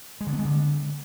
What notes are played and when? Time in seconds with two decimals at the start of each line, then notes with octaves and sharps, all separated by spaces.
0.21 G#3
0.27 D3
0.33 B3
0.39 G#3
0.45 D3